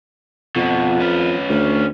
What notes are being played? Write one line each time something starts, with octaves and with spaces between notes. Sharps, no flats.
F2 B2 F3
C#4 B4
D2